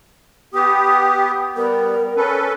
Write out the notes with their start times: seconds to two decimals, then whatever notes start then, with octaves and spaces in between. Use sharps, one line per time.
0.54 B3 G4 D#6
1.56 G3 B3 A#4
2.17 C#4 A4 B4